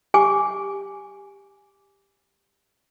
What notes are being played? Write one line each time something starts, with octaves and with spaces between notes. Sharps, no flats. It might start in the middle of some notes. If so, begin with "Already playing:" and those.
G4 G#5 D6